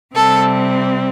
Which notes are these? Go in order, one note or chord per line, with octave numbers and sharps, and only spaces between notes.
C3 G3 C4 A4